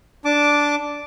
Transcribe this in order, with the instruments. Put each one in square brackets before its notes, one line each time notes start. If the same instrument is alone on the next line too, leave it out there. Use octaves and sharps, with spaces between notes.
[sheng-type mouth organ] D4 A5 D6